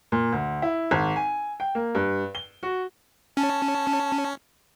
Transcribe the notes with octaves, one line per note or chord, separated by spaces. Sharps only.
A#2
D2
E4
G#1
G#5
G5
A#3
G2
G7
F#4
C#4 A5